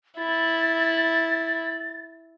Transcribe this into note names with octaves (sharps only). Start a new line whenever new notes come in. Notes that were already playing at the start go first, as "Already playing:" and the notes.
E4 A6